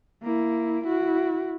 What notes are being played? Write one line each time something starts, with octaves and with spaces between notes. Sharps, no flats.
A#3 E4
E4 F#4